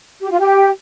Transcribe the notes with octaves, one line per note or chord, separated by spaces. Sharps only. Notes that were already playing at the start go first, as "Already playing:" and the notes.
G4
F4
G4